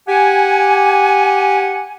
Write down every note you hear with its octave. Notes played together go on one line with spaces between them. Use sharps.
G4 F#5 G#5